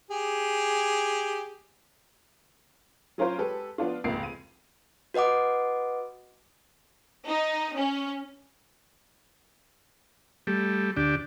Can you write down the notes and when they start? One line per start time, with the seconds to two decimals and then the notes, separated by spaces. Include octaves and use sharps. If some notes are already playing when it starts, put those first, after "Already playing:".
0.11 G4 G#4
3.18 F#3 C#4 F4 A#4 C5
3.38 G#3 G4 A4 B4
3.78 F3 B3 D4 F4
4.04 F1 C#2 G#2 A#3 C7 D7
4.23 D#7
5.14 F#4 B4 D#5 F#5 D6
7.27 D#4
7.76 C#4
10.47 G3 A3
10.97 D2 D4 G4